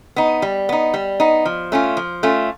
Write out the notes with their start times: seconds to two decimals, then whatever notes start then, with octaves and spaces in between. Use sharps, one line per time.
0.16 B3 D#4
0.42 G3
0.69 B3 D#4
0.94 G3
1.20 B3 D#4
1.46 F3
1.72 A3 C#4 F4
1.97 F3
2.23 A3 C#4 F4